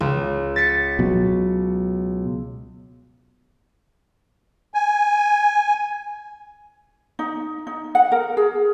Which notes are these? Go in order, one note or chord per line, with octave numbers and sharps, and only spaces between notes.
C#2
A6 B6 C#7
B2 F#3
G#5
D#4
D#4
F#5
A#4
G#4